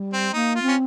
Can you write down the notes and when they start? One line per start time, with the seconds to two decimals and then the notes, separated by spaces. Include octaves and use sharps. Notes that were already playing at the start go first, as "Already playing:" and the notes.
Already playing: G3
0.13 C4
0.34 A#3 D#4
0.55 F4
0.62 C4
0.68 C#4